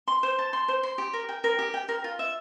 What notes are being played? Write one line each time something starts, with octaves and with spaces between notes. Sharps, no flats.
C6
C5
A5
C6
C5
C6
G4
A#4
G5
A#4
G4
G5
A#4
F4
E5